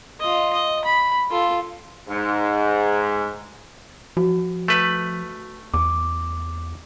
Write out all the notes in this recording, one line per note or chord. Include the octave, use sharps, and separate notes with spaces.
F4 D#5
D#5
B5
F4 A4
G#2
F3 F#4
A3 B4
E2 D6